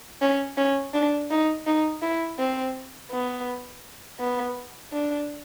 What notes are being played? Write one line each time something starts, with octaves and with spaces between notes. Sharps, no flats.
C#4
C#4
D4
D#4
D#4
E4
C4
B3
B3
D4